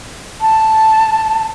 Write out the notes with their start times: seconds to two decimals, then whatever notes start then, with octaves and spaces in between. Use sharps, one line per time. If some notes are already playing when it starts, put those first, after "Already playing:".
0.41 A5